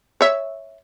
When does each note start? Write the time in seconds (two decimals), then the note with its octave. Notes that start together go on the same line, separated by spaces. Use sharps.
0.21 C#5 E5